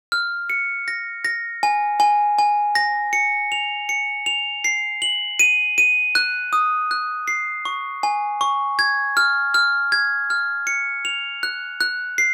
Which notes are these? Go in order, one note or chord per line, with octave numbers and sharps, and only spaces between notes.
F6
C#7
A#6
A#6
G#5
G#5
G#5
A#6
C#7
F7
C#7
F7
C7
F#7
D#7
D#7
F#6
D#6
F#6
C7
C#6
G#5
C#6
G#6
F6
F6
G#6
F6
C#7
F7
F#6
F#6
C7